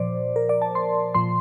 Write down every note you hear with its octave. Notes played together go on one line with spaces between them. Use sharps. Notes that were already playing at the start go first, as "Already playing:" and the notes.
Already playing: A#2 F3 C5 D5
A#4
D5
A5
C6
A#2 F3 C6